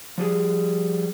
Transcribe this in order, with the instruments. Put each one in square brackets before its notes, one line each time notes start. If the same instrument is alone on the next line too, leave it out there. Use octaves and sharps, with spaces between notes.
[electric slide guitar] F3 G3 G#4